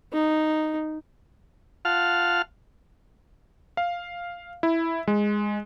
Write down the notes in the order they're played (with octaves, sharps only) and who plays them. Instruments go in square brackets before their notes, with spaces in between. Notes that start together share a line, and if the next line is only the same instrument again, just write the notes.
[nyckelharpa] D#4
[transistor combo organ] F4 F5 F#5 A5 F6
[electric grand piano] F5
E4
G#3